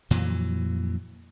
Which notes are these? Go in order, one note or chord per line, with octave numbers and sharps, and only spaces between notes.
F2 A#2 E3 F#3